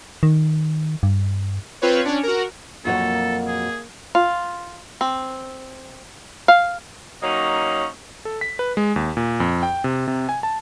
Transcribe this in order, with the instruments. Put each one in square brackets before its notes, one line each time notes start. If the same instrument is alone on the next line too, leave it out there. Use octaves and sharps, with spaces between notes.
[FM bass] D#3
G2
[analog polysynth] C4 F4 B4 C#5
C#4 D4
F#4 A#4
[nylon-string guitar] F2 F#4 C#5 [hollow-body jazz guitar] A#2 F#3 [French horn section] A#3 [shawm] A4
[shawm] G#4
[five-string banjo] F4
C4
F5
[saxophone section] F#3 A#3 C#4 D#4 C#5 D#5
[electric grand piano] A4
B6
B4
G#3
D#2
A#2
F2
G5
C3
C3
G#5
A5